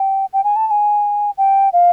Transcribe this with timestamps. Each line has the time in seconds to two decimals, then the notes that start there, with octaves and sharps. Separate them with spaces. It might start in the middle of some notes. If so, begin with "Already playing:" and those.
Already playing: G5
0.33 G5
0.44 G#5
0.56 A5
0.67 A5
0.71 G#5
1.38 G5
1.73 F5